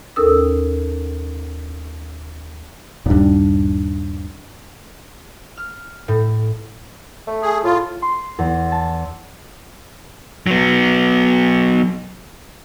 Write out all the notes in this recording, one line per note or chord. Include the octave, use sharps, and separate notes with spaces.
D#2 C#4 A4 A#4 D#6 E6
D#1 G2
F6
A2
A3
G#4
A2 F4
C6
E2
A5
F#3 B3